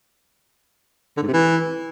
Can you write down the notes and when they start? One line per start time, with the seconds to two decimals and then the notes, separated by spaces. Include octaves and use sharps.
1.17 D3
1.22 G#2
1.28 C3
1.33 E3